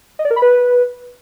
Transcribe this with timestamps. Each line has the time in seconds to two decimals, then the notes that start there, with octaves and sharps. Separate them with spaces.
0.19 D#5
0.25 D5
0.31 A#4
0.36 B5
0.42 B4